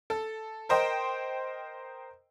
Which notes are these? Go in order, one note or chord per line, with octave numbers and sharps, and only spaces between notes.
A4
A#4 C5 D#5 G5